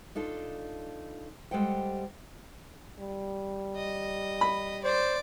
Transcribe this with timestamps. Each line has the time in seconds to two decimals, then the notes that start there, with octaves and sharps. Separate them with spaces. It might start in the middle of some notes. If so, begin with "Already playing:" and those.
0.15 D4 D#4 F4 A4
1.51 G3 G#3 A4 C5 F#5 G5
3.00 G3
3.76 D#5
4.41 B5
4.84 C5 D5